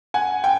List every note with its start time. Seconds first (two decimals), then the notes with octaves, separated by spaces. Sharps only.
0.14 F#5 G#5
0.44 G5